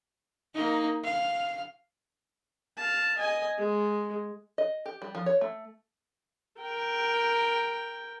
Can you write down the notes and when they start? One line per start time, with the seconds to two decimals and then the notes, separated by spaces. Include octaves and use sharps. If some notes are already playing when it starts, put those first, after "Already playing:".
0.54 A#3 D#4
1.04 F5
2.78 F5 A5
3.18 D#5 G#5
3.58 G#3
4.58 D#5
4.86 G4
5.02 G3
5.15 F3
5.26 C#5
5.41 A3
6.60 A#4 G5